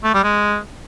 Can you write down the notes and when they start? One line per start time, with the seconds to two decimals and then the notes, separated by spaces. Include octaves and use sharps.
0.04 A3
0.14 G3
0.24 G#3